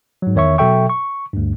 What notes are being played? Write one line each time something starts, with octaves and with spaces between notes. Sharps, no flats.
G#2 F#3
E2 D#3 C#5 E5 C#6
B2 F#3 A4 E5 G5 C#6
C#6
D2 G2